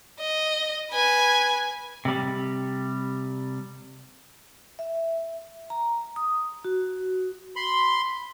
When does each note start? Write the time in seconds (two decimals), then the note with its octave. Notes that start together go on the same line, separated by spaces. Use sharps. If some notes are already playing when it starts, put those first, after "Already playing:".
0.20 D#5
0.91 B4 G#5
2.05 C3 G3
4.79 E5
5.70 A#5
6.16 D#6
6.65 F#4
7.56 B5 C6